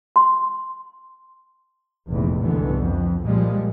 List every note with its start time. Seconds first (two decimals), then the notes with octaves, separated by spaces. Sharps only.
0.16 C6
2.08 F1 A#1 E2
2.43 C2 G#2 D3 E3 B3
2.78 F2
3.25 A#2 F3 G3 G#3